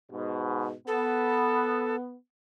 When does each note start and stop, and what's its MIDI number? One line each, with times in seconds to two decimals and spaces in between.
0.11 0.74 44
0.11 0.74 47
0.87 2.16 59
0.87 1.96 69